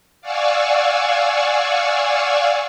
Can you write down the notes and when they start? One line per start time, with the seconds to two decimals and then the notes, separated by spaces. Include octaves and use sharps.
0.21 D5 F5 F#5 G#5 C#6 E6